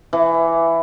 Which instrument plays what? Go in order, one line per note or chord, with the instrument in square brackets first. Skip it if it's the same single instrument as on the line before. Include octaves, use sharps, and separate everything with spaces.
[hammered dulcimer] E3